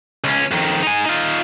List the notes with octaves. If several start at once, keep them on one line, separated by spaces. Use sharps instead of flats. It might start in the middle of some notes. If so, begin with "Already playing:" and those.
C#2 C#4
F2 D#3
D#4 G#5
D#4 F4